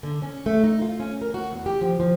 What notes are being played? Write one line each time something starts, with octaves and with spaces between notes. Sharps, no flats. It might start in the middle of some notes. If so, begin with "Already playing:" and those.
D3
C#4
A3
D#4
F4
C#4
A#4
F#4
E2
G4
F3
F3